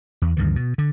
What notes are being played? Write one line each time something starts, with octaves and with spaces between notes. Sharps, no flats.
E2
D2 G2 D#3 E3
B2
D3